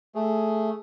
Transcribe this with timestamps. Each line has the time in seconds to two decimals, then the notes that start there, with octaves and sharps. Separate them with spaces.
0.15 A3 G#4